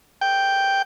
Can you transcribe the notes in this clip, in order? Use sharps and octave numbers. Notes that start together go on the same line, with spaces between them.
G5